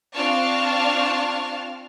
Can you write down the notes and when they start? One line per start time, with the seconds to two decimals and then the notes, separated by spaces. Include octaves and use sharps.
0.14 C4 D4 F4 A5 C#6 F6